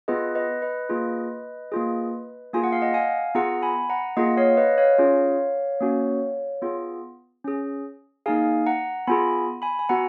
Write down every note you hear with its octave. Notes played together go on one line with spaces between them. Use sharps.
B3 F4 G#4 B4 D#5
B4 D#5
B4 D#5
A#3 F4 G#4
A#3 F4 G#4
A#3 F4 G#4 G#5
F#5
F5
D#5 F#5
F5 G#5
B3 F4 G#4 F#5 A#5
G#5 B5
F#5 A#5
A#3 F4 G#4 D#5 F#5
C#5 F5
B4 D#5
C#5 F5
C#4 F4 G#4
A#3 C#4 F#4
B3 F4 G#4
C#4 G#4
A#3 D#4 G#4 F5 G#5
F#5 A#5
B3 F4 G#4 G#5 B5
G#5 B5
G#5
B3 F#4 F#5 A#5